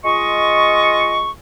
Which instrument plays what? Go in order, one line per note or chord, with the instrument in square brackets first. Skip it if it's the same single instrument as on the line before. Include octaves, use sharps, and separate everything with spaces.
[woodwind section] G#3 F4 D#5 C#6